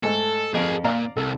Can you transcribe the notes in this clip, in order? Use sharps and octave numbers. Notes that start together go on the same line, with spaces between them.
G#2 A3 A4
F2 G#4 A#4
A#2 D5 F5 A#5
C2 A4